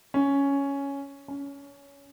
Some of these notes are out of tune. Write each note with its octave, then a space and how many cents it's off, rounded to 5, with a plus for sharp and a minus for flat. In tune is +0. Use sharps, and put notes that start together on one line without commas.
C#4 +5
C#4 +20